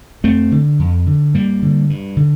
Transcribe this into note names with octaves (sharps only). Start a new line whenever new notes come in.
F2 A3 C4
D3
F2
D3
G2 G3 A#3
D3
G2
D3